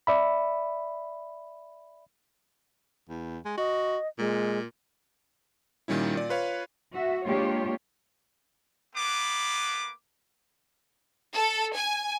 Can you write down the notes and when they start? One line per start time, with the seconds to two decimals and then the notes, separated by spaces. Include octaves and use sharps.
0.07 D5 E5 B5
3.09 E2
3.45 G#3
3.58 F#4 D#5
4.19 A#2 G#3
5.88 A#2 D#3 G3 C#4 E4
6.15 A#2 D5
6.29 F4 B4 C#5 F5
6.93 F#4 E5
7.26 G#3 A#3 D4 F4 G4 C#5
8.95 A#3 B3 B4 D6
11.34 A4
11.75 G#5